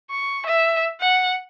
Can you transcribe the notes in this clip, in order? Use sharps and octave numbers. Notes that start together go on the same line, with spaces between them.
C#6
E5
F#5